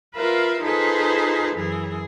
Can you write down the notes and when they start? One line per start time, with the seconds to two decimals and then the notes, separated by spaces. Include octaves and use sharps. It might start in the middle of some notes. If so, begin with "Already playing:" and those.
0.16 F4 A#4 B4 E5 F5
0.62 D#4 F4 G#4 A4 B4 C5
1.55 F#2 E3 G#4